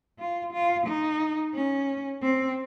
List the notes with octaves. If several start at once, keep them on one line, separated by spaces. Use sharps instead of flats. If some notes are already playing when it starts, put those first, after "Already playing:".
F4
F4
D#4
C#4
C4